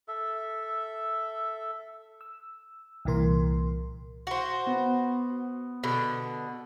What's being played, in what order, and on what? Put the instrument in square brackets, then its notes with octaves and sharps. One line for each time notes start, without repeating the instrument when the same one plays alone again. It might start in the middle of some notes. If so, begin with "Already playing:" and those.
[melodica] A4 E5
[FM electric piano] E6
C2 A#2 E3 A#4 C6
[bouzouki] F#4 C5
[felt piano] B3
[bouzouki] B2 D3